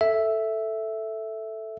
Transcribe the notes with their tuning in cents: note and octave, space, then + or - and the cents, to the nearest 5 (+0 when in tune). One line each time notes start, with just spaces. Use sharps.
A4 +0 E5 +0